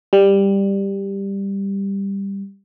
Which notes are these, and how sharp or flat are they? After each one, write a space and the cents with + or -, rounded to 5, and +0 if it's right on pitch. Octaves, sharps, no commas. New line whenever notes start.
G3 +10